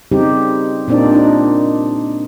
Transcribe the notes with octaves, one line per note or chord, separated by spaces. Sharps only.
C#3 G3 C4 D#4 G4
A#2 A#3 C4 D4 D#4 D5
D4 D#4